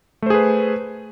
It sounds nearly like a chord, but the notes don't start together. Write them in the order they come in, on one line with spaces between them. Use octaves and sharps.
A3 C5 G#4 B4